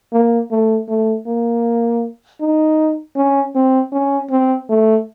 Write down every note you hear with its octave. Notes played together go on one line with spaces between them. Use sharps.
A#3
A3
A3
A#3
D#4
C#4
C4
C#4
C4
A3